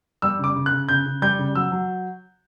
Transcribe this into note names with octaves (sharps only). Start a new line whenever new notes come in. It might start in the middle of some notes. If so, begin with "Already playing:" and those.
G3 E6
C#3 D6
C#3
F#6
C#3
C#3 G6
C#3
G3 G6
C#3
F#3 E6
F#3